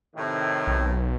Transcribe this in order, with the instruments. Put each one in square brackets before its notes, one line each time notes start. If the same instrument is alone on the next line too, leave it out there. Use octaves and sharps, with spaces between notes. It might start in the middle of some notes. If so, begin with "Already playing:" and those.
[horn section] A2 C3 D#3
[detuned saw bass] B1